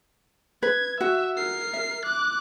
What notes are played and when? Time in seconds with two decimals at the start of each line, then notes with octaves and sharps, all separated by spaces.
0.63 B4 G#6
1.01 F#4 E5
1.35 A#4 C7
1.73 E5
2.05 D6 F#6